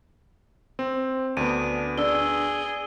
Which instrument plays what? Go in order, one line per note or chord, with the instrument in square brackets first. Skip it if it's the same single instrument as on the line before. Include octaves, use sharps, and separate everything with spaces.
[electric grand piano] C4
[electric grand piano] D2 B3 [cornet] D4 [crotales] D7 D#7
[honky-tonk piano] D4 [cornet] G#4 [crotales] E6 G7